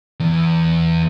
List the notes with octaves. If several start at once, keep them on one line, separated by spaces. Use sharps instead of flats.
E2